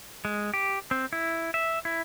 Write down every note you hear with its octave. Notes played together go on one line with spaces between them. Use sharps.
G#3
G4
C4
E4
E5
E4